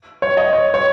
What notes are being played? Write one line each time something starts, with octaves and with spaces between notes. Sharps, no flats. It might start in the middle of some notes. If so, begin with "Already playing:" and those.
C#5
D#5
C#5
C#5